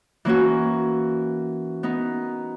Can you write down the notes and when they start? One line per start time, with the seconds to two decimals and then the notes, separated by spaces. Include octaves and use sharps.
0.25 E3 A#3 C#4 F#4
1.83 B3 D#4